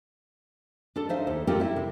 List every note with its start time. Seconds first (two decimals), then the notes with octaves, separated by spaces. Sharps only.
0.96 D4 A4
1.09 D#4 C5 E5 F5
1.27 D#2 A4
1.47 C4 D#4 F4 G4 A4 A#4
1.60 E4 E5
1.76 C3